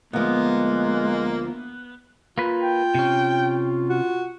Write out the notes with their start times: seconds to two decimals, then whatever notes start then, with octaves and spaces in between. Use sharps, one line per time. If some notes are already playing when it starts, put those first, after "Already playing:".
0.13 D2 F3 G#3 A#3 B3
2.38 A#3 F4 B4
2.61 G5
2.95 C3 C#4
3.89 F#4